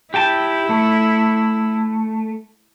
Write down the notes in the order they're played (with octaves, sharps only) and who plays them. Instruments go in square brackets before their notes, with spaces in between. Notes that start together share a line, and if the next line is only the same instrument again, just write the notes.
[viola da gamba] E4 [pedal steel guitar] G4 G5 A5
[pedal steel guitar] A3